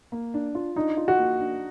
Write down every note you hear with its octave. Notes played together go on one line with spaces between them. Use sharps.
A#3
D4
F4
D4 D#4
F4
F#4
A#3
D4